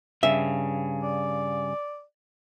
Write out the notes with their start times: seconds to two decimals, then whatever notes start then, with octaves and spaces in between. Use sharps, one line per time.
0.23 G2 C#3 E5
1.03 D5